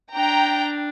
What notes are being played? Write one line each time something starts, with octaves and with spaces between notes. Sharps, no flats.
D4 G5 A#5